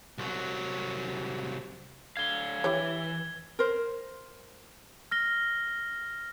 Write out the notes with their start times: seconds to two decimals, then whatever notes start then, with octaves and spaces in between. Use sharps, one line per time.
0.18 C2 F#3
2.17 D3 F5 G#6 G7
2.64 E3 E4 G4 C#5
3.59 A#4 C5
5.11 F6 A#6 G7